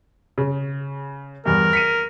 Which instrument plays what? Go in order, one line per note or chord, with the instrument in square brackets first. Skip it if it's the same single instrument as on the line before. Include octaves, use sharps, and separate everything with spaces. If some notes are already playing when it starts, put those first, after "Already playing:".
[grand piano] C#3
[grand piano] E2 G2 [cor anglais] A#4
[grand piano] B6 C#7 D#7